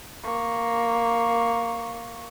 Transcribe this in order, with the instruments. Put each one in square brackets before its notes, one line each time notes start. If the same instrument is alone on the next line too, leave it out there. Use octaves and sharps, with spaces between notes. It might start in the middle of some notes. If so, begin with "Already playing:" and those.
[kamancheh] A#3 C#6